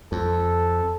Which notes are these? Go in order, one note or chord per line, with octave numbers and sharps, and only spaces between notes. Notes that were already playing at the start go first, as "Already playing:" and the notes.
F2 A4